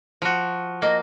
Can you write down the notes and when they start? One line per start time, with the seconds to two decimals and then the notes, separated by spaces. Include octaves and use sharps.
0.22 F3 F#4
0.82 A#3 D#5